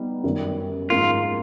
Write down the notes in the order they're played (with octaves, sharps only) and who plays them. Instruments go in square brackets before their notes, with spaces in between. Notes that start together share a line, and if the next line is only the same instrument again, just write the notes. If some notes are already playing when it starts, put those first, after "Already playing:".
Already playing: [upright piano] G3 B3 D#4
F#2 D#3 G3
[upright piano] G#2 F3 A#3 C#4 E4 [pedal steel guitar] F4